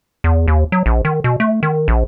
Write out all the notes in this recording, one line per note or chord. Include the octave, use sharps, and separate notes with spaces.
E2
D#2
F#3
A#1
D#3
B2
A3
D#3
A#1